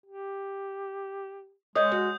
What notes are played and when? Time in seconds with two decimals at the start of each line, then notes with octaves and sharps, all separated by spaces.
0.06 G4
1.75 G#3 C#5 D#5 D#6 G6
1.92 F#4